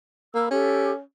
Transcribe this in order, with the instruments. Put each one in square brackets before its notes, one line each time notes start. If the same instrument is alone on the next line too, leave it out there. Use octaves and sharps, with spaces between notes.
[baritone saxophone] A#3 [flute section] A#4 B5 E6
[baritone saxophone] C#4 [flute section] G4 A4 E5